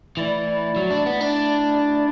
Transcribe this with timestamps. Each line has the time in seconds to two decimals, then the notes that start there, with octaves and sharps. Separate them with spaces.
0.17 E3 A3 E4 D5
0.76 F#3
0.90 D4
1.06 B3
1.21 D4